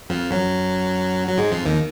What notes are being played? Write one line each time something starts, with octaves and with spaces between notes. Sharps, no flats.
F2 F3
F#2 F#3
F#3
G#2 G#3
F2 F3
D#2 D#3